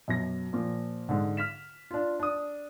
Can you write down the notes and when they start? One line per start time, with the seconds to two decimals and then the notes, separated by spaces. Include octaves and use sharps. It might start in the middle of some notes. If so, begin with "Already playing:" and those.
0.08 F#2 B2 A#6
0.53 A#2 F3
1.09 G#2 D3
1.37 F6 B6 E7
1.91 D4 F4
2.20 D4 D#6